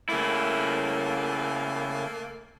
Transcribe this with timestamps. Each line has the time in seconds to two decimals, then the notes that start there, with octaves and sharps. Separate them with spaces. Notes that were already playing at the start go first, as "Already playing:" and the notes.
0.09 C#3 A3 A#3 E4